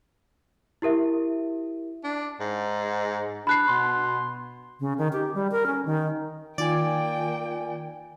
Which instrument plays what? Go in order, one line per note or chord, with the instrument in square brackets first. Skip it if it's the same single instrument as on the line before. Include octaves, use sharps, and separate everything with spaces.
[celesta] E4 G4 A#4 E5
[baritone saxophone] D4
G#2
[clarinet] D4 [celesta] B5 F#6 C7
[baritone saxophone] B2 [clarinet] C6
[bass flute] C#3
D#3
G4
G3
A#4
C#4
D#3
[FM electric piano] D#3 F4 G#5 [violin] A#3 G5 [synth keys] D5